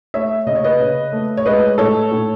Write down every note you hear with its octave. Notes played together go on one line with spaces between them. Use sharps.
A3 C#5 E5
C#3 D#5
C#5
B4 D#5
C#3
A3
C#5
G#3 B4 D#5
A2 A4 C#5
A2